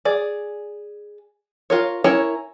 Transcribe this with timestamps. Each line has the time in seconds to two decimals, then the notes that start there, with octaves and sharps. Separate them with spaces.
0.05 G#4 D5
1.70 F4 A#4 C#5
2.04 C#4 E4 A#4 C#5